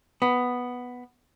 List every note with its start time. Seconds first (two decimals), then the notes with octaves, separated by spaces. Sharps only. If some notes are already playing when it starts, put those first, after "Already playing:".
0.22 B3